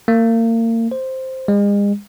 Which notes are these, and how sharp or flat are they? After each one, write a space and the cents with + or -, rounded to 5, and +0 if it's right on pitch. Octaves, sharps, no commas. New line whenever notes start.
A#3 -35
C5 +0
G#3 -40